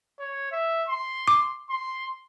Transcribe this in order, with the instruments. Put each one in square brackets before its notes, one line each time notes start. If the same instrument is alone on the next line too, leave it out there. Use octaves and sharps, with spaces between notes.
[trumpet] C#5
E5
C6
[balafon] D6
[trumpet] C6